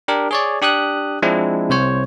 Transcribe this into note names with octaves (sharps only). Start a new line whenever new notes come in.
D4 G4 A#4
G#4 C#5 D5
D4 G4 D#6 F#6
F3 G#3 C4 D4 E4
C2 C3 C5 C#5